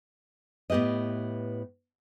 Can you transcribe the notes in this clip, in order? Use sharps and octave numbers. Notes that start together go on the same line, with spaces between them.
A2 B3 G4 B4 D#5